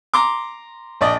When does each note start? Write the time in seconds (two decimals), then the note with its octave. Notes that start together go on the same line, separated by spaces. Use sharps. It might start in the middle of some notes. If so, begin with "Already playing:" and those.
0.14 A#5 C6 D6
1.01 A#1 D5 D#5